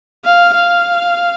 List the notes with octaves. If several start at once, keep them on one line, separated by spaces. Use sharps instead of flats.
F5
F5